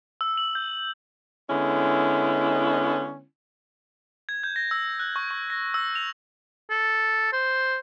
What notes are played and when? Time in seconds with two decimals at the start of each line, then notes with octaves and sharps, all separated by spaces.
0.21 E6
0.37 F#7
0.55 G6
1.49 D3 G#3 B3 C#4 E4
4.29 G#6
4.44 G6
4.56 A#6
4.71 E6
4.99 F#6
5.16 C#6
5.31 C#6
5.50 A#6
5.74 E6
5.96 F7
6.70 A4
7.33 C5